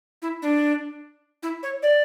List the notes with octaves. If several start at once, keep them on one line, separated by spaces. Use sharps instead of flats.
E4
D4
E4
C#5
D5